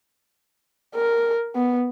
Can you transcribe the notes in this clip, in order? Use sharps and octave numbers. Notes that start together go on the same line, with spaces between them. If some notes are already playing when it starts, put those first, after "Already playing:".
A#4
B3